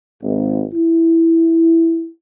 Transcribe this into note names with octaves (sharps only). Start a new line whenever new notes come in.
G#1
E4